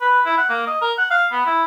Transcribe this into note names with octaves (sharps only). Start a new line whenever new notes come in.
B4
E4
F#5
A#3
D#5
A#4
F#5
F5
B3
E4